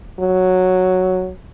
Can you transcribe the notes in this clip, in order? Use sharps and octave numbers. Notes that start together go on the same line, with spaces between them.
F#3